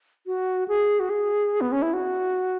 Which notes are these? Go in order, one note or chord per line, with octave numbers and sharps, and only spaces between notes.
F#4
G#4
F#4
G#4
B3
C#4
E4
F#4